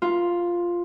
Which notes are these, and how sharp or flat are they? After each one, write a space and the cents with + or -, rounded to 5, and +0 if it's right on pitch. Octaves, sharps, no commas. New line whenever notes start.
F4 +0 A#4 +45